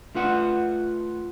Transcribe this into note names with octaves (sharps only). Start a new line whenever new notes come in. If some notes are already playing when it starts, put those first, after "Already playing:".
A3 F4 B4 F#5